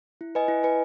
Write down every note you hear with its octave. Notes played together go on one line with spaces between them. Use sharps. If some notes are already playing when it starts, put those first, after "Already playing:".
E4
B4 D#5 G#5
E4
B4 D#5 G#5